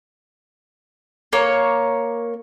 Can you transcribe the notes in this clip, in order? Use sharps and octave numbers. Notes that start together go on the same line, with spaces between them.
A#3 C#5